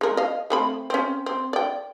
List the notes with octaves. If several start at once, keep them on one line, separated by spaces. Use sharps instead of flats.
G#3 A#4
D#5 F5
A3 C4 B5
C4 C#4
C4
D5 G5